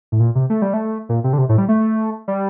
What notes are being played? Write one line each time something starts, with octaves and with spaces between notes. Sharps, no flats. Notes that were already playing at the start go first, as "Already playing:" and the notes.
A2
A#2
C3
A3
G3
A3
A#2
C3
D3
C3
A2
G3
A3
G3